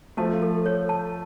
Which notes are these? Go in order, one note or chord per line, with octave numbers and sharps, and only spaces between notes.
F3 A3 A5
A4
C#5
A5